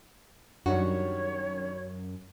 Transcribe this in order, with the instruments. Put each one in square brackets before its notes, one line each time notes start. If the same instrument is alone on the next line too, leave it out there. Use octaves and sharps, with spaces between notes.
[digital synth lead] F#2 [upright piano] D#3 G3 D4 [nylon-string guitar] F#4 [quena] C#5